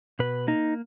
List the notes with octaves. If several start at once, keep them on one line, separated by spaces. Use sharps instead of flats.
B2 B4
A#3 D#4